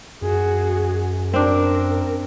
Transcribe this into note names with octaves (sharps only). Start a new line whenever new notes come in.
F#2 F#4 G#4
C4 D4 A#4